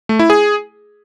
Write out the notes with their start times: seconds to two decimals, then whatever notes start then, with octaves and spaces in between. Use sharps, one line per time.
0.09 A3
0.19 E4
0.30 G#4